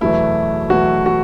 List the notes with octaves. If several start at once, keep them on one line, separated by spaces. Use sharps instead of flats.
E2 B2 F#3 A3 E4
E2 B2 F#3 A3 F#4
F#4